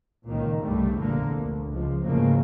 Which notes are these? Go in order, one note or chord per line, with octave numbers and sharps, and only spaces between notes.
C#2 A#2 D#3
C2 G2 C#3 G3 A3
F1 A#1 E2 A#2 D3 A#3
D2
C#2 F3
E2 G#2 C#3 F3 A3 A#3